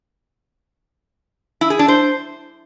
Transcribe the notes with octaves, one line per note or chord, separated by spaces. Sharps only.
E4
G#4
D4
C5